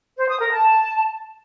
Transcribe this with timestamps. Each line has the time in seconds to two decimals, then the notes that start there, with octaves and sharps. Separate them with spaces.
0.17 C5
0.28 D#6
0.40 A#4
0.51 A5